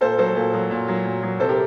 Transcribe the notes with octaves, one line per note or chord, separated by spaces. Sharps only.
A#2 A4 C5
F#3 A4 C5
A#2
F#3
A#2
F#3
A#2
F#3
C3 A4 C5
G4 A#4